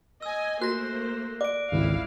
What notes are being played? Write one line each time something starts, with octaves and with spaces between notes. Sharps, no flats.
D#5 G#5 E6
A3 A#3 F#4 C5 F#6 A#6
D5 D6 D7
G#1 C#2 E4 F5